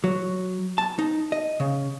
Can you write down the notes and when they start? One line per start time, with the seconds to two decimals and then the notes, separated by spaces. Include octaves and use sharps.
0.04 F#3
0.78 A5
0.99 D#4
1.32 D#5
1.60 C#3